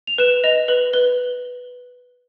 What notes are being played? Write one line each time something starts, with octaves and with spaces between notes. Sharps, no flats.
F7
B4 E7
D#5 F7
B4 F#7
B4 G7